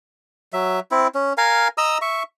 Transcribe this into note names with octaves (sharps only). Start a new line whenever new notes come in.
F#3 E5
C4 E4
C#4
A#4 F5 G#5
D#5 A#5 D#6 E6
E5 C#6